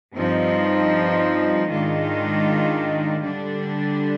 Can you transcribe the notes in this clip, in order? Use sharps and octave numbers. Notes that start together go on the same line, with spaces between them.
G2 F3 C4 D#4
G#2 D#3 G#3 D4 F4
D3 G3 D4